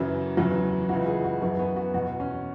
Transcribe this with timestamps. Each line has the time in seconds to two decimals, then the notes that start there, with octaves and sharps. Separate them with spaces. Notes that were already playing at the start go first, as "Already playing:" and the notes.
Already playing: F#2 C#3 E3 F#3
0.37 E2 C#3 E3 F#3
0.89 C#2 C#3 E3 F#4
1.06 G#4
1.24 F#4
1.41 F#2 E3 F#4
1.59 B3
1.76 F#4
1.94 E2 B2 F#4
2.20 C#4